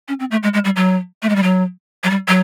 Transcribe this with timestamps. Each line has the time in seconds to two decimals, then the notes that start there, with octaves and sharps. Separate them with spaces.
0.08 C#4
0.20 C4
0.31 A3
0.43 G#3
0.54 G#3
0.65 G3
0.76 F#3
1.22 A3
1.29 G#3
1.36 G3
1.43 F#3
2.04 F#3
2.10 G3
2.28 F#3